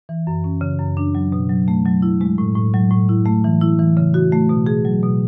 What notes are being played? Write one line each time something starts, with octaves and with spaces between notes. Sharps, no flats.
E3
F#2
C#4
C#3
F#2
D4
F#3
B2
F#3
A3
F#3
E4
G#3
A2
A2
F#3
A2
E4
A3
E3
E4
E3
C#3
F#4
A3
B2
G#4
F#3
B2